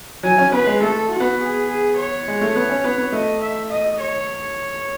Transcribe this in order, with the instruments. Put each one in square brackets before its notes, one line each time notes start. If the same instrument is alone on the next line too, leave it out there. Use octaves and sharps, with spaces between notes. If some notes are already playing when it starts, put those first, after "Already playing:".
[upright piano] F#3 [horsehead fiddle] G#5
[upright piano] C#4
[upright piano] B3 [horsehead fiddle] B4
[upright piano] G#3
[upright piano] A3 [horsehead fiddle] A4
[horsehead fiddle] F#4
[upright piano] B3
[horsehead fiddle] G#4
G#4
C#5
[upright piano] G#3
A3
B3
C#4
B3
B3
[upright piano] A3 [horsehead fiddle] D#5
[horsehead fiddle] E5
D#5
C#5